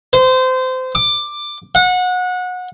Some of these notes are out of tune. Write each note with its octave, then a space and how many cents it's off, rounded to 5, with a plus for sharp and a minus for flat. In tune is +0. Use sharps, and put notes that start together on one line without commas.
C5 -25
D6 +10
F#5 -25